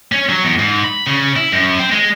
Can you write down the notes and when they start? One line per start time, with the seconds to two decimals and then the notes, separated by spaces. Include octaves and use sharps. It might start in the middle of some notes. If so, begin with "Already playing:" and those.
0.12 C#4
0.29 F#3
0.44 E2
0.59 G#2
0.84 B5
1.07 C#3
1.36 E4
1.52 F#2
1.79 C4
1.92 G#3